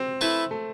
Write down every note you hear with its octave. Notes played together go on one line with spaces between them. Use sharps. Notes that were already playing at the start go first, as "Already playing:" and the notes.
Already playing: C4
A3 E4 B4
A3